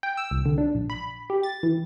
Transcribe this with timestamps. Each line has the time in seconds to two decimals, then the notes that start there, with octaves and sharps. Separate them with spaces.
0.03 G5
0.17 E6
0.31 C2
0.45 D3
0.58 D4
0.75 A#1
0.90 B5
1.30 G4
1.43 A6
1.63 E3